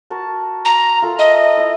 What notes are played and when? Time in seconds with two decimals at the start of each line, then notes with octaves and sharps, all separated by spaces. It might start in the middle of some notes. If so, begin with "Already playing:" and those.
0.10 F#4 A#4 A5
0.65 A#5
1.02 F4 A4 A#4
1.19 D#5 E5
1.57 E4 E5 A#5